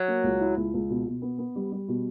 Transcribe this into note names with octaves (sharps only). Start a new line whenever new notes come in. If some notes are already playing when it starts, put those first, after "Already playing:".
Already playing: F#3
A#3
C#2
E4
C#2
C#2
B2
B2
B3
B3
G3
G3
B2